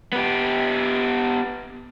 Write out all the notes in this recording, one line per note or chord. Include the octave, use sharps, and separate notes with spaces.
B3 G4